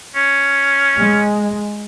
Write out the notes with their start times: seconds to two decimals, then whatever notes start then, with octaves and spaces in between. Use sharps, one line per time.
0.15 C#4
0.96 G#3